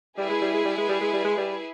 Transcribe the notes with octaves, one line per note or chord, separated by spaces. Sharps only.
G3 E4 G#4 B4
G#3
G3
G#3
G3
G#3
G3
G#3
G3
G#3
G3